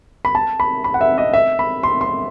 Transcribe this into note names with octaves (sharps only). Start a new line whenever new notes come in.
B5
A5
B5
B5
F#5
E5
D#5
E5
B5
C6
C6